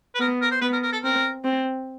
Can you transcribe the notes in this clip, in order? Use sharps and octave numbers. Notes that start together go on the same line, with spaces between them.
B4
B3 A#4
A#4
C5
B3 B4
A#4
A#4
A4
C4 A#4
C4